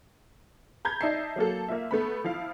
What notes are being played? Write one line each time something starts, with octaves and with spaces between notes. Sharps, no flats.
A#5 B5 G6 G#6
D#4 D5 E5 A5 C7
F#3 A#3 A4
A#3 F4 E5
A3 B3 B5
F3 E4 F5